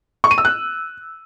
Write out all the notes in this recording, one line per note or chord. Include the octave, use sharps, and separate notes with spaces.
C#6
D#7
E6
F#6